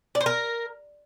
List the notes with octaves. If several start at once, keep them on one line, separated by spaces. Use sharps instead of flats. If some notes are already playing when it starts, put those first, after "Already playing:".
D5
C5
A#4